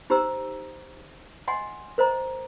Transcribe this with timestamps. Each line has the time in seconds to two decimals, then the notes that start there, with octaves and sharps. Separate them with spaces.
0.10 D#4 G4 C5 A#5 E6
1.48 D#5 F#5 G#5 C6
1.98 A#4 C5 D#5 A#5